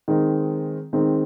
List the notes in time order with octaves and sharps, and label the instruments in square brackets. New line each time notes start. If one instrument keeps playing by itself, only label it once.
[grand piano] D#3 G#3 C4 D#4
D#3 G#3 C4 D#4